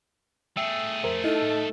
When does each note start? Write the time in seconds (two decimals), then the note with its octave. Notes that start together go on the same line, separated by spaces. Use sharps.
0.57 A3 G#4 E5 G5 E6
1.04 F2 A#4 C5
1.24 D#4 E4 A4 D#5
1.42 A2